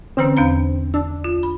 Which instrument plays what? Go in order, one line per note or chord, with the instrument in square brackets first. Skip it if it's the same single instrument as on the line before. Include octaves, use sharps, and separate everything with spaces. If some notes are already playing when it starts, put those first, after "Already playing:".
[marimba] D3 E3 C#4 [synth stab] C4
[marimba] E2 D4 A#5
[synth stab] D4 [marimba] E6
[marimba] F4
B5